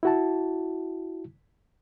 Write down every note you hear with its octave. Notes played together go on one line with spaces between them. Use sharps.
E4 F#4 A5